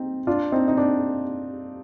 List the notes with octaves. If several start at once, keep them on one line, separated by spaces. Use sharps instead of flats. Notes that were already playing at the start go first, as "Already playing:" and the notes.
Already playing: C4 D#4
D4 F4
C4 D#4
D#4
D4